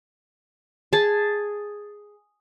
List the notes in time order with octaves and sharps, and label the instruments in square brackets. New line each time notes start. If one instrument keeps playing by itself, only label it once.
[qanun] G#4 A5